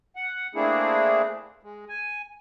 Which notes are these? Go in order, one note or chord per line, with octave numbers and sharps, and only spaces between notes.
F#5
A3 A#3 C4 D4 E4 G#4
G#3
G#5